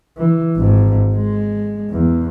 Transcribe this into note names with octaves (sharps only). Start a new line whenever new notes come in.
E3
G#1 G#2
G#3
E2